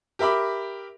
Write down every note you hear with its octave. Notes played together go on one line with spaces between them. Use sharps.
G4 A#4 E5 B5 D6